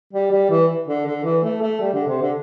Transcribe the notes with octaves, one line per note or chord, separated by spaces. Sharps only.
G3
G3
E3
D3
D3
E3
A3
A3
G3
D3
C3
D3